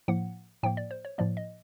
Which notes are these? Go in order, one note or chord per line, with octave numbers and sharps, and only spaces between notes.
A2 F3 A#3 F#5
A2 F3 A#3 G5
D5
C5
C#5
A2 F3 A#3 D5
D#5